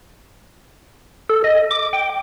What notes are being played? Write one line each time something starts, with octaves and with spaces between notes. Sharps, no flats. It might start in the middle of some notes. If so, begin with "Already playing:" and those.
A4
D#5
D6
G5